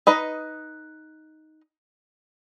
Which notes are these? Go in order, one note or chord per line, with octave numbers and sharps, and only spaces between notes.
D#4 B4 D#5